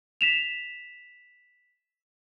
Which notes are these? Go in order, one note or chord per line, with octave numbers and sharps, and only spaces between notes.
B6 E7 F7